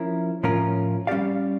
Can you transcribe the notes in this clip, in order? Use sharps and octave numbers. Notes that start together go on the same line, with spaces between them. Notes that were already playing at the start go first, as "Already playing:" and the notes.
Already playing: F3 C#4 E4 A#4
A2 F3 C#4 F4 A#4
G3 C#4 G4 D5 F5